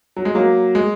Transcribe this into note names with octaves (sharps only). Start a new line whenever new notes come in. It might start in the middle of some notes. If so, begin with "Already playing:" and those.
F#3
G#3
F#3 A#3
G#3